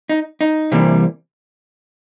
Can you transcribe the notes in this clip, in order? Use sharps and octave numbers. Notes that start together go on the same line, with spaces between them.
D#4
D#4
C3 E3 G3 A#3